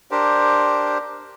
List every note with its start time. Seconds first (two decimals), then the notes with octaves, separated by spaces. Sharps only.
0.11 D4 G4 A#4 C5